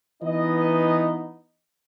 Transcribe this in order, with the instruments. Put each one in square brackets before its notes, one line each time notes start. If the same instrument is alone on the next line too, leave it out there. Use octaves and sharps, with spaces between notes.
[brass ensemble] E3 B3 D#4 D#5